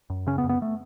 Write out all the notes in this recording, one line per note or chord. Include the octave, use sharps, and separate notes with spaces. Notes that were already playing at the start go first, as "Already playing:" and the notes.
F#2
C#3 C#4
B3
F#2
B3
A3